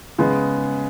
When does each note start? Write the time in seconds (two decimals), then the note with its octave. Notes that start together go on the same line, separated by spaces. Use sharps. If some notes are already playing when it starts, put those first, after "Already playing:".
0.19 C#3 G#3 B3